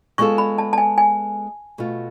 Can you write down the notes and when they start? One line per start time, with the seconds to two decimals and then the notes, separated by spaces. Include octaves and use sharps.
0.18 G#3 B3 F4 A4 C#6
0.38 B5
0.58 A5
0.73 A5
0.78 G#5
0.98 G#5
1.78 B2 A3 F4